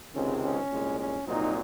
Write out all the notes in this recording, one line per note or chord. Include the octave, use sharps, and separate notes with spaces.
C#2 C3 D#3 G#3 C4 C#4
C#4
C2 A#2 G#3
C#4
C2 A#2 F#3 C4 D#4